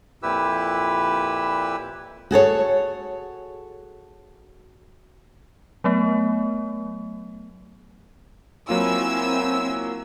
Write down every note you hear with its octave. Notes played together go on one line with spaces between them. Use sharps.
F2 A#2 E4 G4 B4 E6
F#4 G#4 A4 C#5
F#3 A3 B3
F#3 A#3 C4 E4 F4 G#5 E6